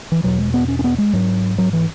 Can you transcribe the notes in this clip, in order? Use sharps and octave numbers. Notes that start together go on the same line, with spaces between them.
E3
E2 B2 F#3
G#3
B3
C#4
C#4
B3
G#3
G#2 F#3
F#3
E3